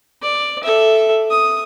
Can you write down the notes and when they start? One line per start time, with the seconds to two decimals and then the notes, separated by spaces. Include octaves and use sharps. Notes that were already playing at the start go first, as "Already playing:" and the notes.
0.23 D5
0.63 A4 E5
1.31 D#6